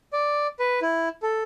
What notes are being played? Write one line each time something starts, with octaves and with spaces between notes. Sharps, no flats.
D5
B4
E4
A4